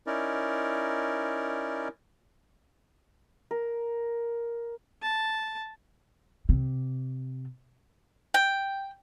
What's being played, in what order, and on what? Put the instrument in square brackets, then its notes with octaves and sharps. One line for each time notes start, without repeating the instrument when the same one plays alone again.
[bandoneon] C#4 D#4 E4 A#4 D5
[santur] A#4
[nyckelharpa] A5
[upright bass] C3
[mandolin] G5